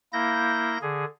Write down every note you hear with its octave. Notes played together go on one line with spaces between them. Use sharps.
A#3 E4 G6 A#6
D3 G#4